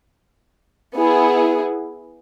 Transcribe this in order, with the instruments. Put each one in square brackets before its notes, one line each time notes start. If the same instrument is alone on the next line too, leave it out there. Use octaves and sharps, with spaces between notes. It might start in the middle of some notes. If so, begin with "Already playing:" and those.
[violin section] B3 E4 G#4